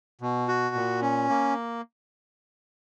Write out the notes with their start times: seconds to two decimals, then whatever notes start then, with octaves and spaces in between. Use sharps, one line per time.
0.21 B2
0.48 F#4
0.75 A#2
1.02 C#4
1.29 A#3